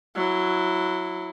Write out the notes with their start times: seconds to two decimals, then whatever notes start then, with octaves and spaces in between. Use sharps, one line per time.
0.15 F#3 E4